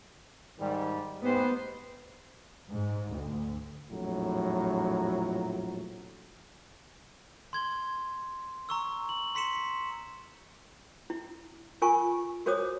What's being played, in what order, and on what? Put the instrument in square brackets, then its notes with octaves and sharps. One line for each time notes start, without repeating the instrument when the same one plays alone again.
[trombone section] G#2 D#3 G3
[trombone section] G#2 G4 B4 [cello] B3 C5
[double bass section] G#2
D2
[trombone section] A#1 F2 A2 F#3
[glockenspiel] C6 G#6 G7
A#5 C#6 E6
F#7
C6 B6 C#7 E7
[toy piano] E4
F4 A#4 G#5 C#6
F#4 A#4 C5 C#5 D6 D#6